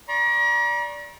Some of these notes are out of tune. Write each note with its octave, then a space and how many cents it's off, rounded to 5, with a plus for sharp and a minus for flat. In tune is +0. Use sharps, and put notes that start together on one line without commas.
D5 -10 A#5 +40 C#6 -45